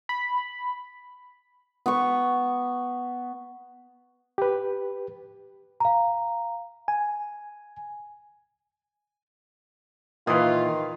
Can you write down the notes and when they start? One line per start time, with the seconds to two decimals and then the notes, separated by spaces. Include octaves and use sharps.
0.09 B5
1.86 B3 C#6
4.38 G4 B4
5.80 F5 A#5
6.88 G#5
10.27 A#2 D#3 E3 F4 B4 F5 D#6